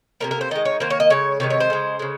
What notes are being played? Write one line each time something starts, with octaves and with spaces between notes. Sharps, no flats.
C3 F#3 A#3 A#4
A#4
C5
D#3 G#3 D#5
C#5
D#3 A#3 C5
C#5
D#5
C#3 G#3 C#5
C3 D#3 G#3 C#5
C#5
C5
C#3 G#3
C#3 G#3